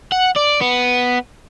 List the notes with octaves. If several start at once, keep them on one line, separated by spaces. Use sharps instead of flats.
F#5
D5
B3